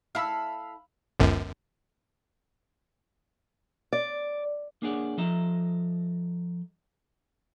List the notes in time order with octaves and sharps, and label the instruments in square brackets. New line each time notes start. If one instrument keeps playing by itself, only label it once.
[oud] E4 A4 [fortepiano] F5 B5 E6
[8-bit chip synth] G1 C#2 F#2
[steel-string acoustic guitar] D5
[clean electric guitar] A#3 D4 G#4 C#5 D5 F#5
F3 A4 D#5 E5 A#5